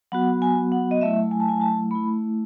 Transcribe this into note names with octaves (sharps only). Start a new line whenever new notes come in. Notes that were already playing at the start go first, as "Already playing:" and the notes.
F#3 B3 F#4 F#5
G#5
F#5
D#5
F#3 A3 E4 E5
G#5
A5
G#5
A5
A3 E4 B5